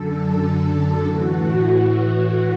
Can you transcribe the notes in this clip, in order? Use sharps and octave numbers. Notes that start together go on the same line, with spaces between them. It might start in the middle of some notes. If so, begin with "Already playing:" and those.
Already playing: F#2 D3 A4
A4
A2 E3 F#4